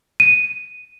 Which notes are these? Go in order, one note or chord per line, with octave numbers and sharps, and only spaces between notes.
D#7